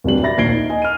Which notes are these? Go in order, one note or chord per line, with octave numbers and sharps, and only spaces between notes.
D1 G3 D4 F#7
D5 E5 B5 A6 A#6
A#1 D#2 G#6 C7 D7 G7
D#4
D#5 G#5
F6 D#7